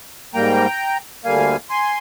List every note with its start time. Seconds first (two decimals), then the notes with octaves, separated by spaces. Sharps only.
0.34 G#2 G3 A#3 G5 A#5
1.24 D2 D3 G3 A#3 F5 G#5
1.70 G#5 C6